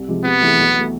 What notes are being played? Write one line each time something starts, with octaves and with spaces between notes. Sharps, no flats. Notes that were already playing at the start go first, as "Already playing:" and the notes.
Already playing: C2
C3 F3 G#3
C3 B3
E3 A3 E4 G#4
B1
B2 A3